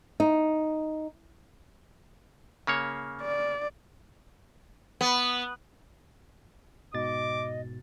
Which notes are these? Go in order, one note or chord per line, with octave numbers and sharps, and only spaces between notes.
D#4
C#3 A#3 C#5
D5
B3
G#2 B2 D#5 D6 A6